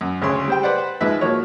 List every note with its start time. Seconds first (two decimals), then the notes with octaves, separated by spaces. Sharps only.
0.01 F#2
0.22 D2 C#3 C#5 C6
0.48 G3 C5 G5
0.63 B4 C5 D5 F#5
1.01 G#2 F3 G#3 B4 D#5 E5
1.21 F3 A#3 F#4 C#5